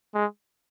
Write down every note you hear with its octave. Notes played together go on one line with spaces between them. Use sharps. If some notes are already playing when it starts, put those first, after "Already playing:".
G#3